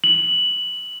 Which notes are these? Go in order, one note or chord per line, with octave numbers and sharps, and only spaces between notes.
F#7